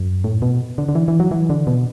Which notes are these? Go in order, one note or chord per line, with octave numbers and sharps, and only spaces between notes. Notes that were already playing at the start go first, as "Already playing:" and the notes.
Already playing: F#2
A2
B2
D3
D3
E3
E3
F#3
E3
D3
B2